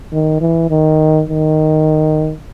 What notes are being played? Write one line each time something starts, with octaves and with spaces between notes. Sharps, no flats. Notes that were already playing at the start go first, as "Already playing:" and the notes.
D#3
E3
D#3
D#3